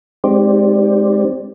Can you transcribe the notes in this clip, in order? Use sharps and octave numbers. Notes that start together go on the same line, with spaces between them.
G#3 C4 D#4 G4 C5 D5